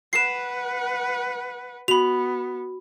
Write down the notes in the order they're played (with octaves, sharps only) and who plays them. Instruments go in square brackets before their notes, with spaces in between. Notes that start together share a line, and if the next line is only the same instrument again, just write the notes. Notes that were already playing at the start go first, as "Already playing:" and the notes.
[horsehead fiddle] B4 F#5 [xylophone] C7 E7
[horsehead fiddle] B3 [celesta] F#4 [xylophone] B5 F7